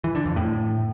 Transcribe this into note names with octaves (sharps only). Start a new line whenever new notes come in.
E3
D3
F2
A2